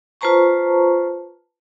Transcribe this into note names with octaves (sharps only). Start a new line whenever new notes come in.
F4 B4 C5 A5 A#5 C#6